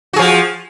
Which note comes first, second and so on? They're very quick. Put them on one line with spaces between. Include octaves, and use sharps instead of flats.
F#4 G#4 F3